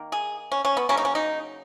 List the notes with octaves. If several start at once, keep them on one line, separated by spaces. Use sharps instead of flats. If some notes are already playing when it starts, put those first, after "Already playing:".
Already playing: D#3 A#3
G#4
C#4
C#4
B3
C#3 F#3 A#3 C#4
D#4
C#4
D#4